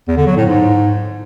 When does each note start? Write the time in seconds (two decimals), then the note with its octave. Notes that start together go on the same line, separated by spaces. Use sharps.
0.08 E2
0.17 D3
0.27 F#3
0.36 A2
0.46 G#2